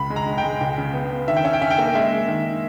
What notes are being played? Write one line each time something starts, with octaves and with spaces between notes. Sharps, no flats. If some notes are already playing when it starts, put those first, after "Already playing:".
Already playing: C#2 B5
G#3
A#5
G#3
G5
G#3
C#2
C#3
B3
B3
D#3 E5
G5
C#4 E5
G5
C#4 E5
G5
A#3 E5
G#3 E5
G#3
D#3